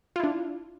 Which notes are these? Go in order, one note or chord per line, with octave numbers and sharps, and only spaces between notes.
D4 E4 F4